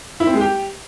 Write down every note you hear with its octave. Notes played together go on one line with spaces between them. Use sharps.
E4
C4
G#3
G4